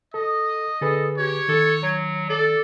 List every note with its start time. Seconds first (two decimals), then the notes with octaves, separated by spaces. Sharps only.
0.14 A4 D#5
0.81 D3 G#4 A4 B4
1.18 G4 C#5
1.48 D#3 A4
1.83 F#3
2.30 A4 D5